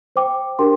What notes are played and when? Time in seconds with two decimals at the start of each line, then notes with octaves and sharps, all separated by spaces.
0.16 C5 G5 D6
0.59 D4 G4 A#4 G5 C6